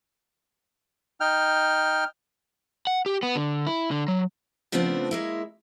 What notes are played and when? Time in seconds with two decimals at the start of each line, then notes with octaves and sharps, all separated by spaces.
1.20 D#4 G5 F6
2.87 F#5
3.06 G4
3.23 B3
3.36 D3
3.67 E4
3.91 D3
4.08 F#3
4.72 C#3 F3 A3 B3 C4 D4
5.11 G#3 A#3 E4